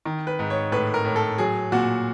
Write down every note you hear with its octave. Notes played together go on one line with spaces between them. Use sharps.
D#3
B4
G#2
C#5
A2 B4
A#4
A2
A4
F#3 G#4
A#2 F#4